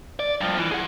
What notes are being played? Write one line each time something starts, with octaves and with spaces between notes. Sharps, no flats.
D5
G2 F3
E3
G#4 F#5